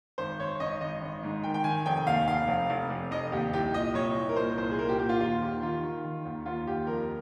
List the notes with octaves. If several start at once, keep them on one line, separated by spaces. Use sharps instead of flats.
G#1 C5
G#1 C#5
G#1 D#5
G#1 D#5
G#1
G#2
D#3 G5
G5
D#3 G#5
F1 G5
D#2 F5
F1 F5
F1
F1
F1
F1 D#5
D#2 G4
C2 G4
A#2 D#5
C2 C#5
C2
A#4
A#2 C5
C2 C5
G#4
A#2 A#4
G4
A#2 G4
F4
D#2 F4
D#3 G4
D#3 F4
D#3
D#3
D#2
D#2 F4
D#2 G4
F2 A#4